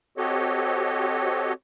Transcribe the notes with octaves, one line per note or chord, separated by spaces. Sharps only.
C4 F#4 G4 A4 C#5 D#5